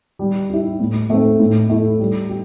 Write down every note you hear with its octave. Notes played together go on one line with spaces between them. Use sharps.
G3
E4 G4
A2
A3 C4
A2
A3 E4
G3
G4